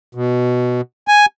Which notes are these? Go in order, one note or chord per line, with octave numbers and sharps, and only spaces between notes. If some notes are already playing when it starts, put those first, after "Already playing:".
B2
G#5